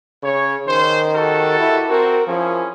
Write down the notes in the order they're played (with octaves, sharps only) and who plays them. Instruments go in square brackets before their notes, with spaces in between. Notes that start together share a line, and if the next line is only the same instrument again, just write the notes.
[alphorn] C#3 [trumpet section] C#5
[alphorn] D#3 [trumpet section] C#4 C5
[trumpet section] F#4 G4 A4
[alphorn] E4
[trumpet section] C4 F#4 [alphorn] A#4
[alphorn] F3 [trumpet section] C#4 E4 G#4